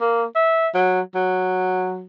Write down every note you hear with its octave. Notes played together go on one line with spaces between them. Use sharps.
A#3
E5
F#3
F#3